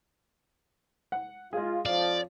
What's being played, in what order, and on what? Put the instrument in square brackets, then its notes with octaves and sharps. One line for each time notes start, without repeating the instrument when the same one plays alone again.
[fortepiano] F#5
[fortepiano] G#3 G#4 [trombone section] F4
[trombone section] F2 F3 [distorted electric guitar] D5 [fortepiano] F5